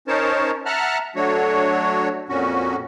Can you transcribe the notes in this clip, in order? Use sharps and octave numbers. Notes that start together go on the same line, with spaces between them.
C#4 D#4 A#4 C5 C#5 A5
E5 F#5 A5 A#5 F6 F#6
F#3 A3 D4 F#4 C#5
F2 A#2 C#4 F#4